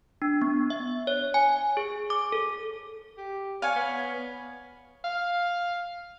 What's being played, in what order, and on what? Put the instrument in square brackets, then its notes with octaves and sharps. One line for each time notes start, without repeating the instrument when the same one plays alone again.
[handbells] D4
B3
E5
C#5
G#5
G#4
D6
A4
[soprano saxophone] G4
[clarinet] C#5 [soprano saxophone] D5 [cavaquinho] F5 G#5
[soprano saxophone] B3 [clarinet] C#5
[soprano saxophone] F5